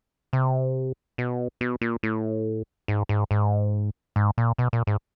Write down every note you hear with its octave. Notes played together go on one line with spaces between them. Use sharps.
C3
B2
B2
A#2
A2
G#2
G#2
G#2
G#2
A#2
B2
A#2
G#2